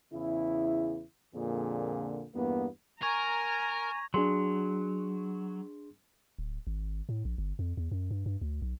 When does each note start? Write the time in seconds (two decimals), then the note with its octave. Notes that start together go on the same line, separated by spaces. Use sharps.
0.13 E2 C#3 E4
1.34 F2 A#2 D3 A#3 G#4
2.34 E2 G2 A#3 B3
3.03 A#4 G#5 A#5 C#6 G#6
4.14 F#3 D4 G#4 C6
6.39 D1
6.67 G#1
7.09 A2
7.25 A#1
7.38 G1
7.59 F2
7.77 E2
7.91 F#2
8.11 G2
8.26 G2
8.42 D2
8.62 B1